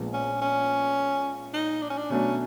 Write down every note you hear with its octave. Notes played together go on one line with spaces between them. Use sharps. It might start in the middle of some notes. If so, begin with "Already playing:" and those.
Already playing: A#1 A#2 F3 G#3 B3
C#4
C#4
D#4
D4
C#4
D4
B2 F#3 A3 C#4 D4